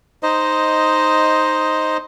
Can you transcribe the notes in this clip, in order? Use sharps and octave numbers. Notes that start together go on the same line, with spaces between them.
D#4 C5 D#5